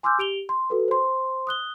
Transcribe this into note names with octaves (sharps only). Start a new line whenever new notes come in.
G#5 C6 D6 E6 F6 G6
G4 D7 F7 G7
C6
F#4 A4 B4
C5 C6
D#6 F#6 G7